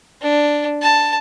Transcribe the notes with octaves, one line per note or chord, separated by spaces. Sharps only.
D4
A5